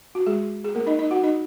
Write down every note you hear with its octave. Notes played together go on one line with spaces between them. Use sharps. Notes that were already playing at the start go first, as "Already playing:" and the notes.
F#4
G#3 G#4
G#4
A#3 A#4
D#4 D#5
D#4 D#5
F#4 F#5
D#4 D#5